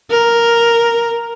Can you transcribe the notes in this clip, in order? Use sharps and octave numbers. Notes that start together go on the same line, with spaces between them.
A#4